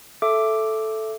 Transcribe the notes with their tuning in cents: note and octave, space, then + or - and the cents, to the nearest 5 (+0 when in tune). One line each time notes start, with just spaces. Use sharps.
A4 -5 E5 +10 D6 +0